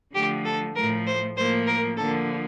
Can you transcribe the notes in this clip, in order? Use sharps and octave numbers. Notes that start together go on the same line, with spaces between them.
D3 F3 A3 G4
A4
A2 F3 A3 A#4
C5
A2 F3 A#3 C5
A#4
D3 F3 A#3 A4